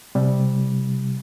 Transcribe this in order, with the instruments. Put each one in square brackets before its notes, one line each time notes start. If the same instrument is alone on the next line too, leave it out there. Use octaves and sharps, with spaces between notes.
[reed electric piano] C3 G3